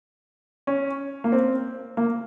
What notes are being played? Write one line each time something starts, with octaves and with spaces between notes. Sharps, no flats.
C#4
A#3
C4
A#3